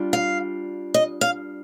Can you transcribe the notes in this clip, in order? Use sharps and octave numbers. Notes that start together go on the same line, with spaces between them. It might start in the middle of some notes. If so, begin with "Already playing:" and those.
Already playing: G3 D4 F4
F5
D#5
F5